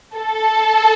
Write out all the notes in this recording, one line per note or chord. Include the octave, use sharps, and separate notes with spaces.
A4